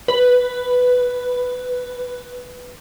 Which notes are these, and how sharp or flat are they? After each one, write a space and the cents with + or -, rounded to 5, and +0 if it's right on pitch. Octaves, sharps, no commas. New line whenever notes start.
B4 +5